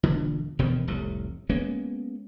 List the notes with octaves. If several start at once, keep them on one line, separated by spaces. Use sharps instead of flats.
E1 A#1 D3
E1 B2 D#3 C4
F1 C2 A2
G#3 A#3 B3 C#4